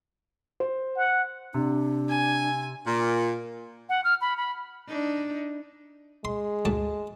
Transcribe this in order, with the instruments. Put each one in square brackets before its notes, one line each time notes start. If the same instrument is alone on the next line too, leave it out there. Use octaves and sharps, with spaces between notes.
[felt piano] C5
[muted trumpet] F#5
[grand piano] C3 [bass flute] D4
[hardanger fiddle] G#5
[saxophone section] A#2
[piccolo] F#5
F6
B5
B5
[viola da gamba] D4 D#4
[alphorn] G#3 [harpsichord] C6
[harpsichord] D2 G#2 A5